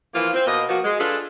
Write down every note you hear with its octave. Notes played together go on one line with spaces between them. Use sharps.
E3 F3 A#3 F4
C4
B2 A#3 D#5
F3 A#3 B3 F#4
G#3
D4 F4 G#4 A4 B4